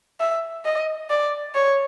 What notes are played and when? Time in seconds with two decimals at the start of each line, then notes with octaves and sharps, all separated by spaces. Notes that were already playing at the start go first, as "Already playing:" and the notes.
0.20 E5
0.65 D#5
1.10 D5
1.55 C#5